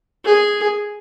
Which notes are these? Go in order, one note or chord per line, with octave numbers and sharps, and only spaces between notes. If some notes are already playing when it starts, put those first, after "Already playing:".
G#4